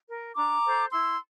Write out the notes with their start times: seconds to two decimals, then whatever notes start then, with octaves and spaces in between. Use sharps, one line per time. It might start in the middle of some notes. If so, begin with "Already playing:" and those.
0.08 A#4
0.35 D4 A#5 D6
0.64 A4 C5
0.92 E4 C6 E6